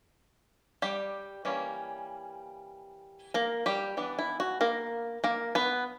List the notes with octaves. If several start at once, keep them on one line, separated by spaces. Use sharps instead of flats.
G3 G4
E3 G3 A#3 C#4
A#3 A#4
G3 G4
E3 B3 D4
E4
F#4
A#3 A#4
A#3 A#4
B3 B4